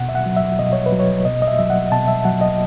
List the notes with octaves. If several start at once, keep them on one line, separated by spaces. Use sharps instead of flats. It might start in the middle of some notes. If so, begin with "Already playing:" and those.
Already playing: B2 F#5
E5
F#5
F#3
E5
B2 D#5
C#5
B4
F#3
C#5
B2 D#5
D#5
E5
F#3 E5
F#5
B2 A5
E5
F#3 F#5
D#5